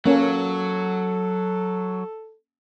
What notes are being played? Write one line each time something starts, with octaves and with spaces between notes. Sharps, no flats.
F#3 A#3 C#4 A4